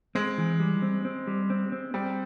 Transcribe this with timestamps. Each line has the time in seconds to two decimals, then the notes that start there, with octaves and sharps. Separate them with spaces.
0.15 G#3 C4
0.38 E3
0.60 G3
0.82 C4
1.05 C4
1.27 G3
1.50 C4
1.72 C4
1.94 G3 C4